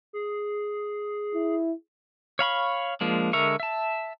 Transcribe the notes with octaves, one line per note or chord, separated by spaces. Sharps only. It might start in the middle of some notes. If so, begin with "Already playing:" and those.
G#4
E4
C#5 F5 B5 C#6
F3 G#3 A#3 D4
D3 G#3 A#4 E5 C#6
E5 A5